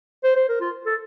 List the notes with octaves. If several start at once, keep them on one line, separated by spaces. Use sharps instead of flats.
C5
C5
A#4
F4
A4